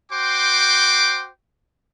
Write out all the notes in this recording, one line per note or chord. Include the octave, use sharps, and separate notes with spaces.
F#4 C5 G5 C6 D6